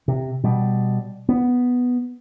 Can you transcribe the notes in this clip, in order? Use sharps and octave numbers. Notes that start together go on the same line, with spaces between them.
C3
B2 G3
B3